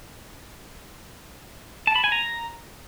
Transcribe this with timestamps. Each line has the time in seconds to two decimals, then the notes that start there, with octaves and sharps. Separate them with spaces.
1.87 A5
1.96 B5
2.04 G#5
2.12 A#5